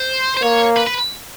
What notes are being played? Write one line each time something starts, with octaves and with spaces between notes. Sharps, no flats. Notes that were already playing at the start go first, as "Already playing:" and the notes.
Already playing: C5
C5
A#3 C#5
B4
B4